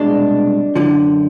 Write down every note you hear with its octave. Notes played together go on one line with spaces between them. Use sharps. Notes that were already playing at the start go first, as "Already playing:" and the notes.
Already playing: C2 B2 G#3 D4
F#2 D3 F3